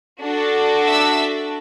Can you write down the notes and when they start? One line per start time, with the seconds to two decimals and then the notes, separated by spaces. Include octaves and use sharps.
0.23 D4 F#4 A4
0.86 E5 E6